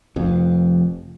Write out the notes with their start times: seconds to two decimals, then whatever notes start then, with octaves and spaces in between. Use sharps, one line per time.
0.16 F1 F2